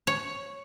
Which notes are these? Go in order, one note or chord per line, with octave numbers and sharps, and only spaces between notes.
C#5